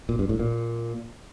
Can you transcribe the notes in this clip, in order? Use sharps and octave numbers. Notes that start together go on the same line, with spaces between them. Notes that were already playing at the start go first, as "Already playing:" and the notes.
A#2
G2
A2
A#2